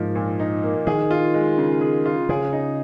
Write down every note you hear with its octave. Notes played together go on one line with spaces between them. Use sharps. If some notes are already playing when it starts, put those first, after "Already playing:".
Already playing: G#2 F3 A#3 D#4
A#2
D#4
A#3
D#3 G#4
F4
G#3
C#3
G#4
F4
C#3 G#4
D#4